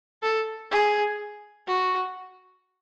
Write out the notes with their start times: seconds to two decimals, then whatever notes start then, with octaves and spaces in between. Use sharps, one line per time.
0.23 A4
0.71 G#4
1.67 F#4